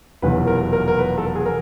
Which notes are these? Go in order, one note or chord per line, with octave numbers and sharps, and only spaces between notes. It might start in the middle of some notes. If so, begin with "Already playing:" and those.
F1 E2 B2 F#3 B4
A#4
A#4
A#4
B4
A4
G#4
A#4